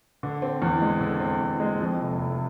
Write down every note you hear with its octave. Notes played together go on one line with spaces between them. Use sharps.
D3
C4
E2
G#3
D3
C4
E2
G#3
F2
F1
F1